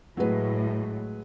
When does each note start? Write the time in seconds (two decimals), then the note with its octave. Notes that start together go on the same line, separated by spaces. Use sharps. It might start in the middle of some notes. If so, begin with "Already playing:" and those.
0.17 A2 F#3 G#3 B4